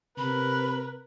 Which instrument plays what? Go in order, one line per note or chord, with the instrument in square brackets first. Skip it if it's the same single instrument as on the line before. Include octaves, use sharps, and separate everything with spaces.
[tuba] C3 [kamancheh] A#4 B4 [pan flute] B5